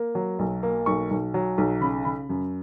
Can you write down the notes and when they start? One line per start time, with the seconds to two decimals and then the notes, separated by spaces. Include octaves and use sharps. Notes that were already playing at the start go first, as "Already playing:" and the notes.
Already playing: A#3
0.15 F#3
0.39 B1
0.63 A#3
0.86 B1 C#6
1.11 B1
1.34 F#3
1.58 B1
1.81 C#3 B5
2.05 C#3 B5
2.29 F#2